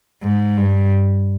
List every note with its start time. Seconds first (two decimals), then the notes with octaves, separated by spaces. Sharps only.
0.23 G#2
0.57 G2